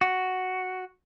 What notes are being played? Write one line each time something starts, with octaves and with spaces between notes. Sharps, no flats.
F#4